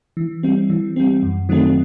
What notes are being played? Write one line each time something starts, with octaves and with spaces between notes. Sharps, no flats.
E3
G3 C4
E3
G3 C4
F#2
D#3 F#3 A3 C4